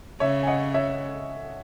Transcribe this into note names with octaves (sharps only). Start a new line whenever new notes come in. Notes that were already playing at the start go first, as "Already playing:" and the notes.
C#3 C#5 E5
G#5
D#5 F#5
C#5 E5